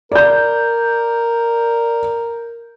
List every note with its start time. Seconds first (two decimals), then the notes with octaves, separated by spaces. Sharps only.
0.12 A#4 D5 G6